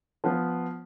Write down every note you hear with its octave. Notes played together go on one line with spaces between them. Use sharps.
F3 B3